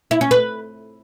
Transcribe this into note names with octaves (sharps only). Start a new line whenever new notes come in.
E4
C#4
B4